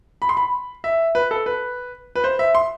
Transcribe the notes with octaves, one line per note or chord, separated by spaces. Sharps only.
B5
C6
B5
E5
B4
A4
B4
B4
C5
E5
C6